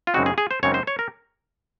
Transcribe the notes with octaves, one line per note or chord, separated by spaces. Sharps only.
F4
F#2 C#3 G#3 C4 D#4 F#4
G#4
G#4
C5
F#2 C#3 G#3 C4 D#4 C#5
C5
C#5
A#4